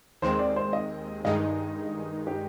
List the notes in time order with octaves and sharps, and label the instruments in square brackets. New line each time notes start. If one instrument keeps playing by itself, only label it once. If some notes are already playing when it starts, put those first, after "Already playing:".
[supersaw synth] D#2 D#3 G#3 C4 [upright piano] C5
[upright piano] D5
C5
D#5
[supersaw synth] G2 D#3 G#3 D#4 [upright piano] D#5
[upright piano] G4